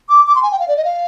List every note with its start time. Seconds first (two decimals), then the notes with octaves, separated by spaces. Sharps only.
0.09 D6
0.27 D6
0.35 C6
0.43 G#5
0.52 G5
0.60 F5
0.68 D5
0.77 D#5
0.85 F5